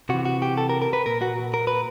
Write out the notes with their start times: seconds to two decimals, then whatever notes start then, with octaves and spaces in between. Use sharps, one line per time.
0.09 C3 E3 F#4
0.25 F#4
0.42 G4
0.57 A4
0.69 A#4
0.82 A#4
0.93 B4
1.06 A#2 A#4
1.22 F#4
1.54 A#4
1.67 B4